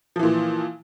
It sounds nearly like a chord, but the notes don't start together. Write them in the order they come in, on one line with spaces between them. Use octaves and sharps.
F3 E3 A#2